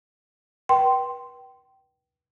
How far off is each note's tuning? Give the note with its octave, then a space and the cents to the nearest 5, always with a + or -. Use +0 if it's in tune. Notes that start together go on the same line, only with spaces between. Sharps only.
B4 -35 G5 -20 C6 -5